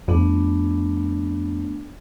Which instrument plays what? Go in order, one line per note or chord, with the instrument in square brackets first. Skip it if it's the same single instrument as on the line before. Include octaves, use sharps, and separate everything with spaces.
[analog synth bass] F2 [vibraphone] A3 B3 D4